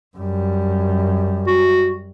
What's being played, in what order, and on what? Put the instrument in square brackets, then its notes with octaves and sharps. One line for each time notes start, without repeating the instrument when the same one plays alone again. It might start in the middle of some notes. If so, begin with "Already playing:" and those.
[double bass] F#2 G3
[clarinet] F#4